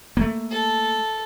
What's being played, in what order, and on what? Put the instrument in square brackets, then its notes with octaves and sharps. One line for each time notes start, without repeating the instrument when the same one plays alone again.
[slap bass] A3 A#3
[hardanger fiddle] A4